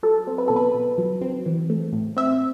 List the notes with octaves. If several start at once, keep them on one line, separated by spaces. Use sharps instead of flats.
F#3 A4
C4
B4
B2 A4
B4
B2
F#3
C4
E3
A3
A2
C4 E5